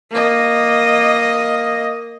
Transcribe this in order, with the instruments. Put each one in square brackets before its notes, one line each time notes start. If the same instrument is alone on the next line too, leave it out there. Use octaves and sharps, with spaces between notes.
[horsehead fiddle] A#3 D#5